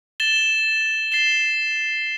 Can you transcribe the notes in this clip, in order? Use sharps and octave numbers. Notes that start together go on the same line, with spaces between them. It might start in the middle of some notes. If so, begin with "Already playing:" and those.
A6 E7 G7
A6 C7 E7 G7